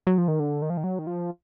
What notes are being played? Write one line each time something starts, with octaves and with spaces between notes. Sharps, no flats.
F#3
F3
D#3
D3
D#3
F3
D#3
F#3
D#3
F3